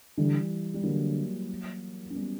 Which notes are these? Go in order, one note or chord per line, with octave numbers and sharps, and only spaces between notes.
D3 E3 G3
G3
D3 F#3 A#3
C#4
G3 B3